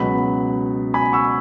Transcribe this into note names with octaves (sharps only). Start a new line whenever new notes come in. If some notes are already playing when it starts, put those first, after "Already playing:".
Already playing: C#2 B2 F#3 B5
G#5 B5
C#6 E6